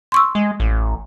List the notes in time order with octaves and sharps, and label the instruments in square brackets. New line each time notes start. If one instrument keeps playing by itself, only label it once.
[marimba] C6 C#6 E6
[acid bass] G#3
A1